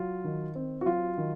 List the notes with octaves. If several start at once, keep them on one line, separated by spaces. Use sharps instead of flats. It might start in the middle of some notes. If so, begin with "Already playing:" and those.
Already playing: F#3 F4
D#3
C4
F#4
F#3 F4
D#3